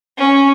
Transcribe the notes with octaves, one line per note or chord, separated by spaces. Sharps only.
C#4